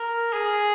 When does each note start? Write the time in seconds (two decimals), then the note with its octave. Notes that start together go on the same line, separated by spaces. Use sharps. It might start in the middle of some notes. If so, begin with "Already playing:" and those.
Already playing: A#4
0.33 G#4